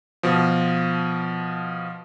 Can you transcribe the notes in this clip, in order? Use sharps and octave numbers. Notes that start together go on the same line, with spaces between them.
B2 F3